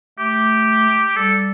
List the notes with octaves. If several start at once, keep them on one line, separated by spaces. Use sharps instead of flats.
A3 G4
G3 A4